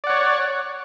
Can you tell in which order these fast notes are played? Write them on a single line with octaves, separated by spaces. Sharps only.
D5 F#5 C#5